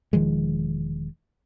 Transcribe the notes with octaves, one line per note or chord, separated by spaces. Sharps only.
E1 D#3 F3 G#3